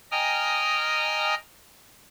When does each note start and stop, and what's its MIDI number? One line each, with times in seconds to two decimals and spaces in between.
0.11 1.35 75
0.11 1.35 79
0.11 1.35 80
0.11 1.35 82
0.11 1.35 87
0.11 1.35 89